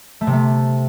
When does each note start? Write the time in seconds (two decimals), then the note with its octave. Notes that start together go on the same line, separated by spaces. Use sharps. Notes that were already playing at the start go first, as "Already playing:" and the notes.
0.21 A3
0.27 C3
0.33 A3